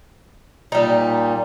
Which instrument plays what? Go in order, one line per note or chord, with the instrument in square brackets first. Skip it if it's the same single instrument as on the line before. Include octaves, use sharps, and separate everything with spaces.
[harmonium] A#2 [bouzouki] G3 D#4